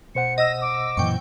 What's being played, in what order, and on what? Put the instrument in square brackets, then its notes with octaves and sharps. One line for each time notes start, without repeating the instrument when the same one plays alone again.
[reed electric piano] B2 C5 F#5 [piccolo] C#7
[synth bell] D#5 E6 [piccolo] A#6
[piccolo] D6
[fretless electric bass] F#2 A#2 E3 [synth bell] G5 C#6